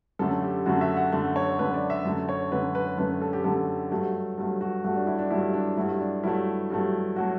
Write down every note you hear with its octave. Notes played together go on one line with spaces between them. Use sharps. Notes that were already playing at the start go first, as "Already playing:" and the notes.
F#2 D3 A3 A4
G4
F#2 D3 A3 F#4
E5
F#5
F#2 D3 A3 E5
C#5
F#2 D3 A3 B4
D5
E5
F#2 D3 A3
C#5
F#2 D3 A3 B4
B4
F#2 D3 A3 B4
A4
G4
F#2 D3 A3 A4
G2 F#3 A3
G2 F#3 A3
F#4
G2 F#3 A3 F#4
D4
E4
D4
G2 F#3 A3 E4
D4
G2 F#3 A3 E4
D4
G2 F#3 A3 E4
G2 F#3 A3
F#3 A3 F#4